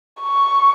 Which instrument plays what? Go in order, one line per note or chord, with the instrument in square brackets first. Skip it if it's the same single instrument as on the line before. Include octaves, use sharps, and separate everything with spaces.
[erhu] C#6